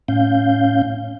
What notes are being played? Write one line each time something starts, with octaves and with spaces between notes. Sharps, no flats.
A2 C#4 F5 G6